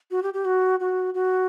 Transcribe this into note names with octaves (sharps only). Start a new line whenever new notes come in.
F#4
G4
G4
F#4
F#4
F#4